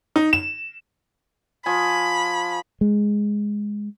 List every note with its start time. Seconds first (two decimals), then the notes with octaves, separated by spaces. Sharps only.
0.16 D#4
0.33 E7
1.66 F3 G#5 B5
2.81 G#3